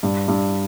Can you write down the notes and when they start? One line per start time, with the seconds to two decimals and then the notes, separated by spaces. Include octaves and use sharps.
0.03 G2
0.28 G2